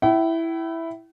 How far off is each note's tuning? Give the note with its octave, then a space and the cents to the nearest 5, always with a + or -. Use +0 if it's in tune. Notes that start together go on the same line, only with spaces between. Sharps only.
E4 +0 G5 -45